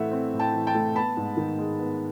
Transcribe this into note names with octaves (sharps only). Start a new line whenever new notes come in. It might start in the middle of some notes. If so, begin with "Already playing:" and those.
Already playing: A2 E3 A3 C4 E5 F#5
C4
A2
G5 A5
E3
G5 A5
A3
B3 A5 B5
G#2
D#3
G#3
B3